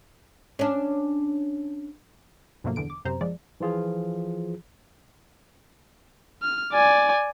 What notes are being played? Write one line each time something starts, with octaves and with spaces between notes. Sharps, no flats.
C#4 D4
G2 B2 F3 F#3 A3 A#3
E2 D3 D7
D6
F#2 C3 C5 A#5
F3 G#3 D5
E3 F3 F4 G#4
F6
D5 G#5